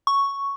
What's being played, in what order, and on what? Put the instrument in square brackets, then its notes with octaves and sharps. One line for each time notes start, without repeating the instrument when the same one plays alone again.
[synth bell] C#6